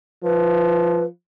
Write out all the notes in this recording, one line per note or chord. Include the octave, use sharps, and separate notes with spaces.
F3 B4